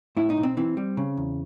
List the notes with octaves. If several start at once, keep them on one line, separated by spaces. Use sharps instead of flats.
A2 E4
D#4
B1
C4
E3 C4
G3
C#3
E2